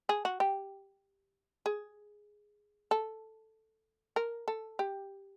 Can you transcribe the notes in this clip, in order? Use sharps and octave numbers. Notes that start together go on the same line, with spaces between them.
G#4
F#4
G4
G#4
A4
A#4
A4
G4